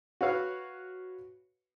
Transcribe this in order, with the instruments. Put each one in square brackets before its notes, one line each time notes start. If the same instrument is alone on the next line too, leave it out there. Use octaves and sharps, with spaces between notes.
[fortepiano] F#4 B4 C#5 F5 F#5